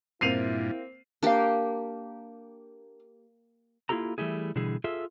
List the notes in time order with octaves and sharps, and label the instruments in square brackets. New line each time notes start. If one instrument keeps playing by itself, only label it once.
[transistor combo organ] G2 A#2 [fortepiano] A#3 C4 [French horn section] E4 [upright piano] C7 D#7 F7
[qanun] A#3 G4 [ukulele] D4 F5
[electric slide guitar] A#3 E4 F4 G4 A4 A#5
E3 G3 A3 E4 G#4
B2 D3 E3 G3 G#4
F4 G#4 A4 E5